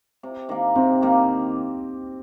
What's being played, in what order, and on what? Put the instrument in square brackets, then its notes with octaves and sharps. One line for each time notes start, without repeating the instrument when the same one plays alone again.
[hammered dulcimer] C3
D#3 A#3
[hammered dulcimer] C3 [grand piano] C4
[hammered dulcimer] D#3 A#3